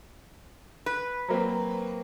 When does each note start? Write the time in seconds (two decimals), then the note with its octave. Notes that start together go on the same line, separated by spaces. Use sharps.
0.86 B4 F#6
1.28 F#3 A#3 C4 C5 A#5